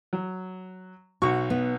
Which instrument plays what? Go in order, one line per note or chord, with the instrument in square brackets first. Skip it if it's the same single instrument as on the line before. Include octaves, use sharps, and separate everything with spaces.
[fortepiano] F#3
[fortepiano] B1 C#6 [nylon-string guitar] F#4
[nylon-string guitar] B3